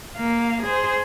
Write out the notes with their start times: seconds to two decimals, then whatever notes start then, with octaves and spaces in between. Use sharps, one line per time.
0.16 A#3 F5
0.63 G#4 C5